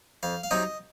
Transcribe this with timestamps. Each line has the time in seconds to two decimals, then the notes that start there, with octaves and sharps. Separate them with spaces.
0.23 F2 F5
0.43 F5
0.51 C3 F#3 C4 D#4 D#5